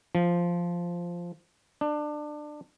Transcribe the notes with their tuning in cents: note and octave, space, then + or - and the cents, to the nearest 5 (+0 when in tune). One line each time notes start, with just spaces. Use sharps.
F3 -5
D4 +25